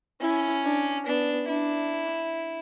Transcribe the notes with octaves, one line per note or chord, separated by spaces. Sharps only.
C#4 E4
D4
B3 D4
D4 E4